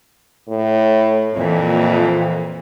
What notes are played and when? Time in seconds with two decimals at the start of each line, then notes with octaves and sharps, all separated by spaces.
0.48 A2
1.34 F2 A#2 E3